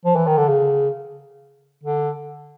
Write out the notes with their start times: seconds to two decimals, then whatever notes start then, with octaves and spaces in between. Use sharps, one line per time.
0.05 F3
0.16 E3
0.27 D#3
0.37 D3
0.48 C#3
1.83 D3